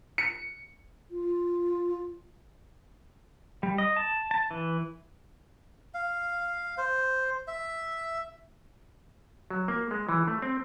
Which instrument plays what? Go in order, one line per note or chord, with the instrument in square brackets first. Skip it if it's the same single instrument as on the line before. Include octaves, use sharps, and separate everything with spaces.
[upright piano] C#7
[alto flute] F4
[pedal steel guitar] G3
D#5
A5
A5
E3
[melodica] F5
C5
E5
[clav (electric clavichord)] F#3
A#3
G#3
E3
A3
C4